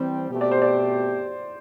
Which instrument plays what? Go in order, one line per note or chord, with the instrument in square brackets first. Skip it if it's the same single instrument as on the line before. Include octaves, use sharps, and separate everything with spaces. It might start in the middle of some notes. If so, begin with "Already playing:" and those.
Already playing: [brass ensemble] E3 G3 C4
B2 A3 C4 G4
[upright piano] D5
C5
D5